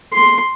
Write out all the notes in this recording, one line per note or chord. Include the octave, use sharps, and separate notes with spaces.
C6